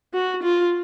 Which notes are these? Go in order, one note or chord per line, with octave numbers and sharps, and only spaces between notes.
F#4
F4